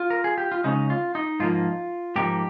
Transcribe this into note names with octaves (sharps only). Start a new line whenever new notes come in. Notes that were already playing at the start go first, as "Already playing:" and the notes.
Already playing: F4
A#4
G#4
G4
F4
C#3 G#3 C#4 D#4
F4
D#4
G#2 F3 A#3 D#4 F4
G#2 F3 A#3 D#4 G4